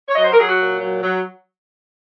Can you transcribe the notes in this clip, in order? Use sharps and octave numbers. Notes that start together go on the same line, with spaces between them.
C#5
F#3 D#5
C5
A#4
F#3 G#4
F#4
A#2
F#3
F#3